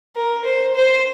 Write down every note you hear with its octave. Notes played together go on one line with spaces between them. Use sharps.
A#4
C5
C5